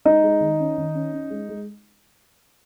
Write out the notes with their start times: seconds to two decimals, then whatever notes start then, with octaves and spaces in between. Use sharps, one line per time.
0.05 G#3 D#4 D#5
0.24 G#3
0.41 D#3
0.60 C#4
0.78 D#3
0.95 C#4
1.13 C#4
1.31 G#3
1.49 G#3